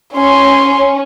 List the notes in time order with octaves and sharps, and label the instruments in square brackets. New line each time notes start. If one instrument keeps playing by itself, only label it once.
[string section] C#4 [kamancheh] C#5 C6